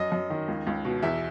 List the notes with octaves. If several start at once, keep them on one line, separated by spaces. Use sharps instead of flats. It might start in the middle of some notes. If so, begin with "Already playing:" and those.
Already playing: F#2 D#5
F#2
D#3
C#2
C#2
B2
E2 E5